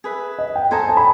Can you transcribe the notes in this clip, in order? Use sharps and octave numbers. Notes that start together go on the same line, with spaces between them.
G#4 B4 E5
D#5
G5
A4 C5 D#5 G#5 A#5
A5
B5